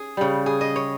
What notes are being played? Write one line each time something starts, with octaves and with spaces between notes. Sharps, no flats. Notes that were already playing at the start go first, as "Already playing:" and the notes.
Already playing: C#4 G#4
C#3 G3
G#4
D#5
C#5